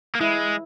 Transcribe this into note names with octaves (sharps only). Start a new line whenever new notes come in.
A#3
G#3 E4